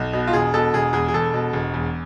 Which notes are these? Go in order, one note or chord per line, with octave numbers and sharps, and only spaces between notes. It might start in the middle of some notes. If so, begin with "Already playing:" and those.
Already playing: B1
B2
F4
E1 G#4
B2 A4
E1 G#4
E2 G#4
G#4
E1 A4
B2
E1
E2